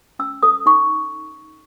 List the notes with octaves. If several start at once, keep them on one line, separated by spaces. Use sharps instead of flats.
C#4 E6
A4 D#6
D#4 C#6